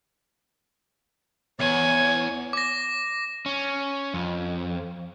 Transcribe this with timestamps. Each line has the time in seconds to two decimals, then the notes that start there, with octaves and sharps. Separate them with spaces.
1.59 E2 C#5 G#5
2.53 D6 A#6
3.46 C#4
4.14 F2